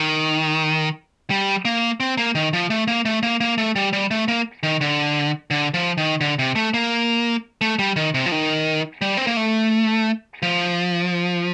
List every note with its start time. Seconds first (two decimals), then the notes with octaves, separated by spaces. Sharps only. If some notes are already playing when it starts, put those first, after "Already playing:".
Already playing: D#3
1.30 G3
1.65 A#3
2.00 C4
2.17 A#3
2.35 D#3
2.53 F3
2.70 A3
2.88 A#3
3.05 A3
3.23 A#3
3.41 A#3
3.58 A3
3.76 G3
3.93 G3
4.11 A3
4.28 A#3
4.63 D#3
4.81 D3
5.51 D3
5.74 F3
5.98 D#3
6.21 D3
6.39 C3
6.56 A3
6.74 A#3
7.61 A3
7.79 G3
7.96 D#3
8.14 C3
8.26 F3
8.32 D#3
9.02 G3
9.17 C4
9.27 A#3
9.37 A3
10.43 F3